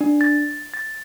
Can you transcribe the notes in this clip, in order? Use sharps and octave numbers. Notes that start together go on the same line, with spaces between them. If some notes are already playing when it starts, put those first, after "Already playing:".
D4
A6
A6